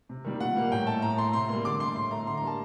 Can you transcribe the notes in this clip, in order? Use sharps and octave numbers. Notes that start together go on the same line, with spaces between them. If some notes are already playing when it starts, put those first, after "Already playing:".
C3
D#3 G3 A#3
A#2 F#5
G3 A#3
A2 G5
A3 A5
A2 A#5
A3 C6
C3 C6
G3 A#3 C6
D3 D6
A3 C6
A2 C6
A3 A#5
D3 C6
A#5
G3 A#3 A5